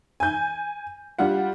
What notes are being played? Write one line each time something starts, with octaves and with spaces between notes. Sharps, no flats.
G#5 G6
G3 D4 F4 F#5